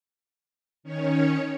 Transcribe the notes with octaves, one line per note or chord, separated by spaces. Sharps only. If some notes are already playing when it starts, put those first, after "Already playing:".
D#3 C#4 C#5